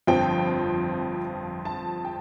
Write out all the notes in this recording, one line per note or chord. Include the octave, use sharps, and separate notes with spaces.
G1 F2 F3 C4 G5
A5
G5